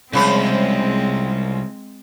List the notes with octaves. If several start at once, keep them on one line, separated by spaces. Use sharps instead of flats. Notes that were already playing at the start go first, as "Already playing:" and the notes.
C2 C#3 F3 G#3 C4 C5